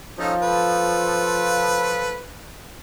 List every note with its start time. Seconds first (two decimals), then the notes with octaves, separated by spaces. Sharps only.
0.19 F3 C#4 D#4 A4
0.42 A4 B4